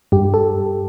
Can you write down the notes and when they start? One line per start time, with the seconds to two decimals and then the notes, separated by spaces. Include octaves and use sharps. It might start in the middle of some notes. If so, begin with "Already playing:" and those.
0.12 G2 G4
0.34 A4